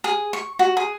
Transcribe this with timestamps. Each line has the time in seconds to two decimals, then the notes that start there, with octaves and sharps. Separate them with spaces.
0.04 G#4
0.33 C#6
0.59 F#4
0.77 G#4